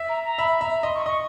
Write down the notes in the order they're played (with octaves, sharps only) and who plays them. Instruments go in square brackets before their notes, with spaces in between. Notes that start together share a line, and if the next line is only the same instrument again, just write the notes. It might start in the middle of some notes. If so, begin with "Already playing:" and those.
Already playing: [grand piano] E5
[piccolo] A#5
A#5
[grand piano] E5 [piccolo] B5
[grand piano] E5 [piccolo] A#5
[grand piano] D#5 [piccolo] C6
[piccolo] C#6
[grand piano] D#5 [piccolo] C#6